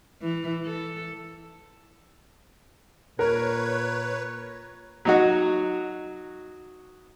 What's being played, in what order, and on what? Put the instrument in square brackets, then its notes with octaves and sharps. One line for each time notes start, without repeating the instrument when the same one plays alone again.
[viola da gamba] E3
A4
[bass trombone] A#2 [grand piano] A#4 [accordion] B4 C#5
[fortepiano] F#3 D#4 F#4